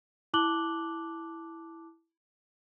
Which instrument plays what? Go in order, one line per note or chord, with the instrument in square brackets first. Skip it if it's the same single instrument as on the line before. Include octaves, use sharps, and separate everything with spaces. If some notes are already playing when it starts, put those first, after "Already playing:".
[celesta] E4 A5 D6 F#6 F#7 G7